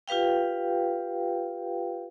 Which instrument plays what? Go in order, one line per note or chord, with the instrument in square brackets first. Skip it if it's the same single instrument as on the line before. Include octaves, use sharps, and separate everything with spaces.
[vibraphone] F4 G4 B4 F5 G5